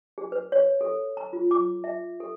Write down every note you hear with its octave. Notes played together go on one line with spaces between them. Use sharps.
G#4
B4
C#5
A4
A#5
F4
D6
E5
A4